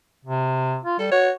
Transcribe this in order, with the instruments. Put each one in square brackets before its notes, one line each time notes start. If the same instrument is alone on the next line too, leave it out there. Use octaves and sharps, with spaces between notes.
[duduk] C3
F4
[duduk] G3 [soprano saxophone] A4
[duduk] F#4 [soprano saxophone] C#5